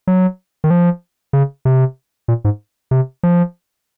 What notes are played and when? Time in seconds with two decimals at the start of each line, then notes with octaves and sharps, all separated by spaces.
0.07 F#3
0.64 D#3
0.70 F3
1.33 C#3
1.65 C3
2.28 A#2
2.45 G#2
2.91 C3
3.23 F3